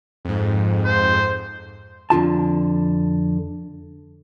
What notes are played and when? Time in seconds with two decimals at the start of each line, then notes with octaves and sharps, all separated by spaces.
0.25 F2 G#2
0.84 C5
2.10 F2 D3 F4 A5